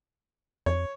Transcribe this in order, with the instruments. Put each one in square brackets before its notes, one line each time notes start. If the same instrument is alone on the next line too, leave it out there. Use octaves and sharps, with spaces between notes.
[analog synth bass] F2 [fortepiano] C#5